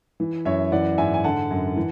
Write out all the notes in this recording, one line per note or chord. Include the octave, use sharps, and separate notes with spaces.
E3
F#2 C#5 E5
E3 D5 F#5
G#2 E5 G#5
G#5
D3 F#5 A5
F#2
E3